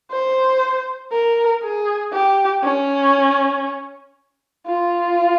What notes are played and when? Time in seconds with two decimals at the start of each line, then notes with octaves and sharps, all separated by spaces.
0.11 C5
1.12 A#4
1.63 G#4
2.13 G4
2.63 C#4
4.67 F4